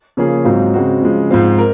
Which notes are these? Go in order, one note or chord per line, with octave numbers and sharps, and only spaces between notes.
C#3 F3 A#3 C#4 G#4
G#2 F#3 C4 F4
C#3 G#3 C4 F#4
C#3 F3 G#3
G#2 F3 G#3 C4 F4
A#4